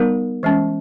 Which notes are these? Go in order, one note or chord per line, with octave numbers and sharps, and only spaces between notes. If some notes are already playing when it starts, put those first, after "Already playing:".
Already playing: G3 B3 D#4 A#4
E3 G#3 C#4